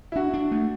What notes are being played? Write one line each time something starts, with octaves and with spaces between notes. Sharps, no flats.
E4
D4 F#4
D4
A3